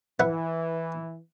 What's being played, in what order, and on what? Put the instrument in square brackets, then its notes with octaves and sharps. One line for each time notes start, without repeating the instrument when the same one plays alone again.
[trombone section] E3 [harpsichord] B4 E5 F#5